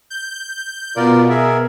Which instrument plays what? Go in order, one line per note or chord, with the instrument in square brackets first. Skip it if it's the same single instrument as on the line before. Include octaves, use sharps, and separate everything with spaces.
[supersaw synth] G6
[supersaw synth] B2 B3 [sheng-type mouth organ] F4 A#4 D5
[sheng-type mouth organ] G#4 A#4 E5